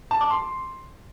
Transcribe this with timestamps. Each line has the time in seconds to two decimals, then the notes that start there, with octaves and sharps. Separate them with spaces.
0.11 A5
0.21 D6
0.30 C6